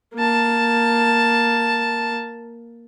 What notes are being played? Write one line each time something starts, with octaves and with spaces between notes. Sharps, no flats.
A#3 A5